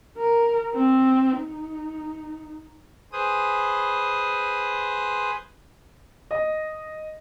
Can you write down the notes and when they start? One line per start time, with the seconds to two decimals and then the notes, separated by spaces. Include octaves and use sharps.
0.18 A#4
0.74 C4
1.39 D#4
3.12 G#4 B4 C5 D#6
6.31 D#5